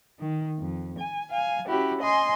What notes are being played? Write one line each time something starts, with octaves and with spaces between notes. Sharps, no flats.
D#3
F2
G#5
F5 G#5
C#4 E4 F#4 G4
D#5 G#5 C6